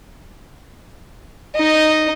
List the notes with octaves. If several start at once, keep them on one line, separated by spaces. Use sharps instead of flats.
D#4 D#5